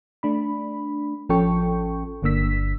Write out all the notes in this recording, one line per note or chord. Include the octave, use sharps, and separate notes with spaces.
A3 D4 B5
A1 F3 C#4 A4 G5 C#6
G1 D3 A#3 D4 E6 B6